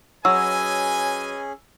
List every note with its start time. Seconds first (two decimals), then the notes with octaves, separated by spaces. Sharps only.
0.25 F#3 C#4 G#4 B4 D#5 G#5 E6